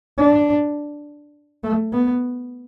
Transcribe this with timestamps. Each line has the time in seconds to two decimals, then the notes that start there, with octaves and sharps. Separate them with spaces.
0.18 D4
1.64 A3
1.92 B3